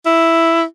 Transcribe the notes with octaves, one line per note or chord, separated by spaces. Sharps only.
E4